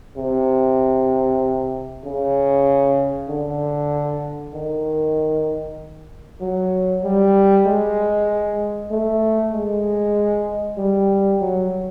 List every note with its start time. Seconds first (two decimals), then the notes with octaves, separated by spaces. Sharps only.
0.16 C3
2.04 C#3
3.29 D3
4.54 D#3
6.41 F#3
7.03 G3
7.66 G#3
8.91 A3
9.53 G#3
10.77 G3
11.40 F#3